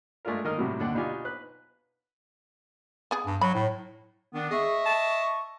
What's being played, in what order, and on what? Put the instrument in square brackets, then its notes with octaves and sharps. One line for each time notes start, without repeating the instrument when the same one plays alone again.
[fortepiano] G#3 A3 D4 F4 A#4
D#3 A#3 A#4 D#5 F6
A2 C3 F#3 G3
D#2 D3 D4 D5 F#5 G5
B2 D4 D#4 F4 G4 G#5
B4 F#6
[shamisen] B3 G#4
[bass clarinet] G2
[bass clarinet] F#3 [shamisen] B5
[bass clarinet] A2
[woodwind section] D#3 B3 D4
[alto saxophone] G#4 [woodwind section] D#5 E5 C#6
[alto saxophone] A5